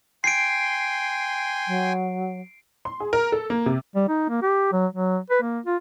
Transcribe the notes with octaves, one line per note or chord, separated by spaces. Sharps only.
G5 G#5 C6 C7 D7
F#3
C6
G#4
A#4
A4
A#3
C3
G3
D#4
A#3
G4
F#3
F#3
B4
A#3
F4